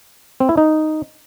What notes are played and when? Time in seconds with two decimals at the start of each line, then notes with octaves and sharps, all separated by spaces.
0.40 C4
0.49 E4
0.57 D#4